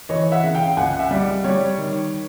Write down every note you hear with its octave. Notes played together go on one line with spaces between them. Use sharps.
E3 C#5 D#5
E5 F#5
C#3
F5 G5
C#2 F#5 G#5
E5 F#5
G3
G3 C#5
D#3